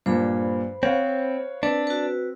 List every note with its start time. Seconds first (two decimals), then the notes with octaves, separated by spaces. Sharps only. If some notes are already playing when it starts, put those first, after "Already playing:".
0.06 G2 A#2 C5 B5
0.83 C4 C#5 F5 F#5
1.63 C4 D4 B4
1.87 F#4 B4